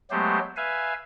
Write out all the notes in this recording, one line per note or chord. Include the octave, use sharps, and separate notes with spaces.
F#3 G#3 A3 B3 G4 C5
B4 E5 F5 G#5